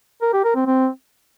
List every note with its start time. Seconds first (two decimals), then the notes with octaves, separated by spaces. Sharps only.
0.22 A#4
0.33 G4
0.44 A#4
0.55 C4
0.67 C4